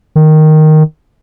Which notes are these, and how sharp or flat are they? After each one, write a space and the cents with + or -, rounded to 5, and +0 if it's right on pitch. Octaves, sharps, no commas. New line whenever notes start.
D#3 -5